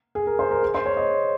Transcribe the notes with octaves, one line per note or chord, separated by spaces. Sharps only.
G#4
A#4
C5
A#4
G#4
C5
C#5
D#5